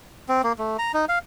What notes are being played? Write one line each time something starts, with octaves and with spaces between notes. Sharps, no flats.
C4
A#3
A3
A#5
D#4
F5